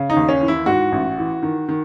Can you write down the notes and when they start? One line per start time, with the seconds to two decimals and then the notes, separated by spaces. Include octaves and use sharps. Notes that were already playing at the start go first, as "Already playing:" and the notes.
Already playing: C#3
0.10 D#4
0.16 D#2
0.29 C#4
0.41 E3
0.48 E4
0.66 G#2 F#4
0.92 A1
1.18 E3
1.43 D#3
1.69 D#3